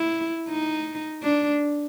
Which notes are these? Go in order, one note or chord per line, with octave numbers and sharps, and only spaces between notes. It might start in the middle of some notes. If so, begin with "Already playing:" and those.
Already playing: E4
D#4
D4